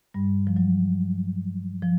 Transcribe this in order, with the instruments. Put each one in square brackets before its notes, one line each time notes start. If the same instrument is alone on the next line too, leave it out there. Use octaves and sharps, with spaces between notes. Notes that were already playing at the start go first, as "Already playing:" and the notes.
[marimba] G2 G3
F3
F#3
F3